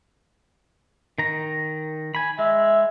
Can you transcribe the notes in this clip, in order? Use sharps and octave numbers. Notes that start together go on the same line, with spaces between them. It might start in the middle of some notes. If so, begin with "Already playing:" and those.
D#3 A#5
G#5 B5
G#3 E5